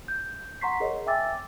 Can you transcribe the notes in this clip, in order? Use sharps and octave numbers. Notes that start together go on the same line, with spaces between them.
G6
F#5 A#5 C6 C#6 B6 C7
G#4 A#4 C#5 D#5
E5 G5 G#5 D6 E6 A6